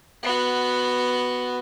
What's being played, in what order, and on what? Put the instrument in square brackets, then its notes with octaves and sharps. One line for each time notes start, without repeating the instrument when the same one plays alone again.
[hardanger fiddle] B3 F#4